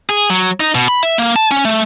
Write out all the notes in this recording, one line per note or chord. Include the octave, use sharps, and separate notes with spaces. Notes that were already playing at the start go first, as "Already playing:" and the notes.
G#4
F#3
D#4
B2
B5
E5
A#3
A5
C#4
A3